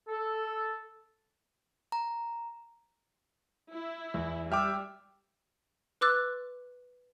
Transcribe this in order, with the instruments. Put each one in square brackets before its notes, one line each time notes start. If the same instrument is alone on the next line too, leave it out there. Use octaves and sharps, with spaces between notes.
[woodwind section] A4
[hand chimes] A#5
[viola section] E4
[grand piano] E2
[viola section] G3 [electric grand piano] E5 G5 D6 [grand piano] E6 F6
[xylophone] B4 C6 D6 E6 F#6 A6